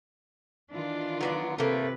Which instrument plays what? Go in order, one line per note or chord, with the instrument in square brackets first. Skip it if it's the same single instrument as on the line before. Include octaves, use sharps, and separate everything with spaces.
[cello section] D#3 E3 F4 [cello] D4
[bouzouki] F#3 B3 D5
[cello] C3 B4 [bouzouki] A3 A#3